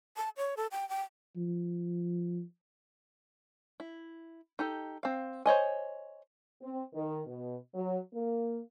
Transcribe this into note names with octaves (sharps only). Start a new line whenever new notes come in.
A5
C#5
A4
G5
G5
F3
E4
D#4 G4 A4
C4 F5
C5 C#5 D#5 G#5
C4
D#3
B2
F#3
A#3